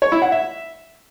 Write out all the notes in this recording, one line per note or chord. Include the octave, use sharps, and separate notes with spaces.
C#5
E4
F#5
E5